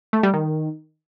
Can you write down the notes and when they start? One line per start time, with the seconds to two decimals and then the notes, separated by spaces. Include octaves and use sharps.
0.13 A3
0.23 G3
0.34 D#3